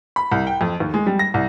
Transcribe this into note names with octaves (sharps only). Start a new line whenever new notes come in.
B5
C2
G5
F2
D#2
G#3
G3
A#6
C2